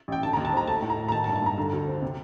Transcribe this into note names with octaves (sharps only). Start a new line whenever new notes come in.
A1 G5
D3 A5
A#5
D#2
A5
C4 A#5
A3 A5
A2
A#5
A2
A#5
D#3 A5
A5
G2
A5
G2 A#5
D3
D2
C4
C3